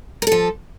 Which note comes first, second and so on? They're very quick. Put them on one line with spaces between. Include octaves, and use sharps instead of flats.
A#4 A4 F3